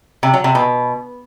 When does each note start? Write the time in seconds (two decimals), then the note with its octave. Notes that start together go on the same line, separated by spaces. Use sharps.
0.23 C3
0.34 F#3
0.44 C3
0.55 B2